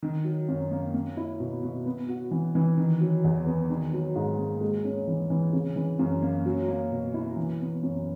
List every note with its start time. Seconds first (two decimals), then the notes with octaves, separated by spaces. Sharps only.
0.03 D#3
0.24 F#3
0.48 F#2
0.71 A#3
0.94 A#3
1.17 E4
1.40 B2
1.63 B2
1.86 B3
2.08 F#4
2.31 E3
2.55 E3
2.78 D#3
3.01 F#3
3.24 E2
3.46 B3
3.70 D#3
3.93 F#3
4.15 G#2
4.38 A#3
4.61 G#3
4.85 C#4
5.07 E3
5.30 E3
5.53 C#3
5.76 E3
5.99 F#2
6.22 A#3
6.46 F#3
6.68 A#3
6.91 B2
7.14 E4
7.37 E3
7.60 B3
7.83 F#2